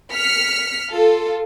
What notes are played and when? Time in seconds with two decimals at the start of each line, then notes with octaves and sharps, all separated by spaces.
0.12 F6 B6 C#7
0.92 F4 A4